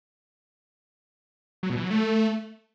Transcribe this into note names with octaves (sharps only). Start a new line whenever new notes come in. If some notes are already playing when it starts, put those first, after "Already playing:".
F#3
B2
E3
F#3
A3